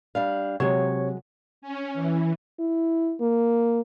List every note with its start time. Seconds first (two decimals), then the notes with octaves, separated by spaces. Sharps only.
0.15 G3 D4 F5
0.60 C3 F#3 G#3 C#5
1.62 C#4
1.94 E3
2.60 E4
3.21 A#3